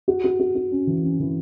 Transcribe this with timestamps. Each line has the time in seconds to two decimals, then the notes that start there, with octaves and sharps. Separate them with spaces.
0.08 F#4
0.24 F#4
0.40 F#4
0.55 F#4
0.71 C#4
0.87 E3
1.03 C#4
1.20 E3